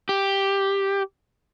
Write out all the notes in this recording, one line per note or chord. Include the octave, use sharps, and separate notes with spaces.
G4